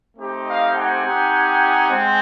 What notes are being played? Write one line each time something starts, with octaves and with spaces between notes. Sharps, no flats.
A3 C4 D#4 G4
D#5 F5
F#5 G#5
C4 D#4 G4
G#3 C4